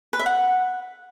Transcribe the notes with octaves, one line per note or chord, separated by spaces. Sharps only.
B4
E5
F#5